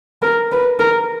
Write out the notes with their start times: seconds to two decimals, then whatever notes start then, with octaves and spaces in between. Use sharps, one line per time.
0.22 A#4
0.52 B4
0.79 A#4